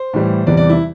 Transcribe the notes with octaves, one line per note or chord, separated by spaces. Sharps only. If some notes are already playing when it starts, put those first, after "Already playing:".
Already playing: C5
A2 E3 G3
E2 C3 E3 G3 D5
D5
E4